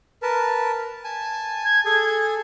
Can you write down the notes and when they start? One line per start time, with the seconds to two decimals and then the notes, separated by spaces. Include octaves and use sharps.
0.22 A#4 B4 A5
1.04 G#5 A5
1.65 G#6
1.85 G#4 A4 G#6